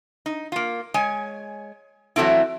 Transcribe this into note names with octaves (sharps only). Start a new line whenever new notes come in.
D#4
A#3 F4
G#3 C#5 G#5
E3 F#3 G3 A3 C4 E4